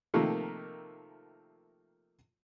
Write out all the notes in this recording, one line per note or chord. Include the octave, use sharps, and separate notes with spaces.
C3 D#3 F3 A3 A#3